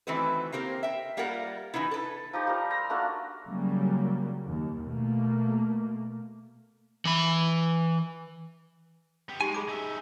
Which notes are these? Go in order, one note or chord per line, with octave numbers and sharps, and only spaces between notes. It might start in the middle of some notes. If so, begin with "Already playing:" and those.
D#3 E3 A3 C4 F#4 B4
A#3 C4 G4 A#4 C5
E5 G5
G3 A#3 F4 G4 A#4 F#5
E3 G#3 B3 D#4 E4
A4 B4
F3 D#4 G4
G3 A#4
A#5 C6 E6
A3 A#3 D4 F#4
C#3 F#3 G3 A#3
D#2
B2 A3 A#3
E3 B5
B3 G4
G#3 D#4 G4 G#5
G#4 B5 D6
D#4 E5